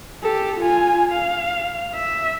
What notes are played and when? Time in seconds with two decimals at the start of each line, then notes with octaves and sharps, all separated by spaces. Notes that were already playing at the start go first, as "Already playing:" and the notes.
0.22 G4 A4
0.60 F4 G#5
1.12 F5
1.95 E5